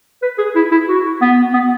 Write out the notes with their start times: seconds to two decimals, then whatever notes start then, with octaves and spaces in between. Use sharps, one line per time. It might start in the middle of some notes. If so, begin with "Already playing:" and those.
0.22 B4
0.38 G#4
0.55 E4
0.71 E4
0.88 F#4
1.21 B3
1.53 B3